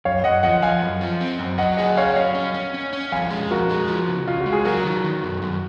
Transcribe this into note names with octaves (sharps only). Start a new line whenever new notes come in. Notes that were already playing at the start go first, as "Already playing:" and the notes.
F#2 C#5 F5
F#2 D#5 F#5
F3 D#5 F#5
F3 F5 G#5
F#2
F3
C4
F#2
F#3 D#5 F#5
G#4 D#5 F#5
C#4 C#5 F5
F#3 C#5 F5
C#4
C#4
C#4
C#4
F2 F5 G#5
G#3
F2 F#4 A#4
G#3
F3
C#3
C#3 F4
F#4
G#3
G#4
F#3 F#4 A#4
D#3
D#3
F#2
F#2